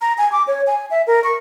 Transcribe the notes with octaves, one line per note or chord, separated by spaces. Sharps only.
A#5
G#5
D6
C#5
G#5
E5
A#4
C#6